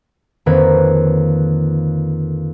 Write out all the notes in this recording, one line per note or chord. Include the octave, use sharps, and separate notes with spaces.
F2 D3 D#3 A#3 B4 C#5